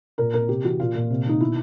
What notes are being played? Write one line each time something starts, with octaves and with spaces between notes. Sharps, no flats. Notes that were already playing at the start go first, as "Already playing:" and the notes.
A#2 A#4
A#2 A#4
C3 G4
E3 F#4
A#2 F4
A#2
C3
D#3 D#4
B2 E4